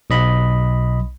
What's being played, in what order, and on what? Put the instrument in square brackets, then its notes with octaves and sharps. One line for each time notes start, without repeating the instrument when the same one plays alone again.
[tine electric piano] B1 D#5 B5